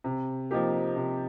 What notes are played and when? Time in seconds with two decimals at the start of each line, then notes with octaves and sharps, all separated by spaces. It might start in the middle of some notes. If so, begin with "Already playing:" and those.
0.04 C3
0.51 F3 A#3 D#4 G4
0.96 C3